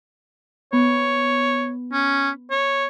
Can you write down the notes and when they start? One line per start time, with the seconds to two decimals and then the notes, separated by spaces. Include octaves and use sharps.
0.73 B3 C#5
1.93 C#4
2.51 C#5